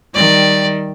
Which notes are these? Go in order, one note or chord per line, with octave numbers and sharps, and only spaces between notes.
D#3 G3 D5